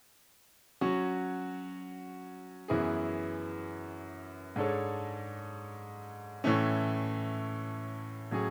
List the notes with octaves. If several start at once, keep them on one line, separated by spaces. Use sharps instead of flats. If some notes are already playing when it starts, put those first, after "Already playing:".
F#3 C#4 F#4
F#2 E3 B3 E4 G#4
G#2 G#3 D4 A4 C#5
A2 E3 A3 C#4
A2 F#3 C#4 G#4